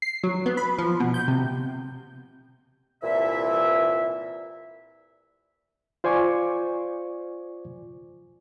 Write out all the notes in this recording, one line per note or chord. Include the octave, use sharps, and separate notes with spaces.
C7
F#3
B3
B5
F3
B2
G6
C3
C2 A#2 E3 E5
F4 C5 D5 G#5 C#6 D6